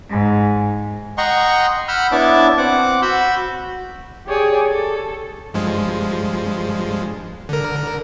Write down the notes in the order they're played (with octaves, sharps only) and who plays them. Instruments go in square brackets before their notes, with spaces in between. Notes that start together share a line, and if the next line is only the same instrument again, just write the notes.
[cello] G#2
[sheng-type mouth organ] D#5 F#5 G5 A#5 C6 C#6
F#5 B5 E6 F6 G6
B3 D4 E4 C#5 A5 D6
C4 F#5 D6
F#4 B5 E6 G6
[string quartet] G4 G#4 C#5 D5
A4
[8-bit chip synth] G2 F3 G#3
D3 A#4